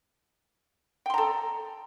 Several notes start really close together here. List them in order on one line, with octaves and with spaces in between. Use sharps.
G5 C6 A#5 A4